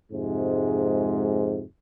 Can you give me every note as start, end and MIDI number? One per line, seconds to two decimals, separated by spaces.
0.12 1.63 41
0.12 1.63 44
0.12 1.63 48
0.12 1.63 56